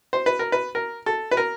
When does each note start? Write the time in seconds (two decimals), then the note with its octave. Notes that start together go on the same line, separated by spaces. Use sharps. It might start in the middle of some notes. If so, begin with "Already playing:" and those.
0.13 C5
0.26 B4
0.39 A#4
0.52 B4
0.75 A#4
1.06 A4
1.31 B4
1.37 A#4